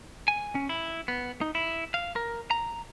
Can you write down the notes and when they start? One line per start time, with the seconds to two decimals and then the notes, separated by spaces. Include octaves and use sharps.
0.28 G#5
0.55 C#4
0.69 E4
1.08 B3
1.41 D#4
1.55 E4
1.94 F5
2.16 A#4
2.51 A#5